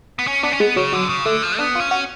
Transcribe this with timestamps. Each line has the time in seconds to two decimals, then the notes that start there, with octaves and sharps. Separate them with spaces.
0.19 B3
0.27 C#4
0.43 B3 D4
0.52 C#4
0.60 G#3 B3
0.76 C#3 F#3
0.93 D3 F#3
1.09 C#3
1.26 D3 A3
1.43 F3
1.59 B3 D4
1.75 F4
1.80 C#4
1.91 F#4